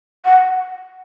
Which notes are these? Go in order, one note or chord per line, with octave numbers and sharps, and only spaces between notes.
F#5